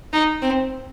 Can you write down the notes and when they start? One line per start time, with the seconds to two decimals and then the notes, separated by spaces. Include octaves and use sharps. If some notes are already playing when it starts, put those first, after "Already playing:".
0.13 D#4
0.42 C4